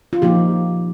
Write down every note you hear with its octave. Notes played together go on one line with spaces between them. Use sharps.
F4
A#2 F3 A#3 D#4 G4